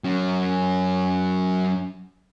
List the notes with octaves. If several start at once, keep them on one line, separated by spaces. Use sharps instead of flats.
F#3 C#4